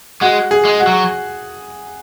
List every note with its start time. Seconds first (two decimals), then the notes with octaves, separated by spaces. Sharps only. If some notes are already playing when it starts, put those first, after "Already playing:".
0.21 G#3 F#4
0.51 G#4
0.65 G#3
0.80 F#4
0.87 F#3